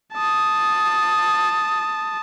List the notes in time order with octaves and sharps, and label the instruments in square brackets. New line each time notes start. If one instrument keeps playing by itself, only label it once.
[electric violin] A5 D#6